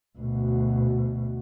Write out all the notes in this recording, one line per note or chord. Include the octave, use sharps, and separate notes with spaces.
D2 B2